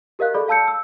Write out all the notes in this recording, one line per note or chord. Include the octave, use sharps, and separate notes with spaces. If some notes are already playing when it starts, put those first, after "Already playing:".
G4 A#4 D#5 F5 F#6
G#4 A4 D5 B5
F5 A5 E6 G6 C#7
E6